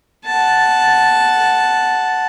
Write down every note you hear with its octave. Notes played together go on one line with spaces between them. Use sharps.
F#5 A5